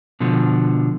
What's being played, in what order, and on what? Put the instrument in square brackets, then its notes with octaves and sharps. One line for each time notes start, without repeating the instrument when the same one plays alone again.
[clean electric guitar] B2 D3 F3